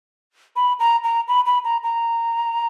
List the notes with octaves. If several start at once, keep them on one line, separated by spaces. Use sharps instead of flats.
B5
A#5
A#5
B5
B5
A#5
A#5